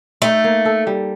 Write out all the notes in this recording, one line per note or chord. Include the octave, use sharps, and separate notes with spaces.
A3 D#4
A#3
A4
G3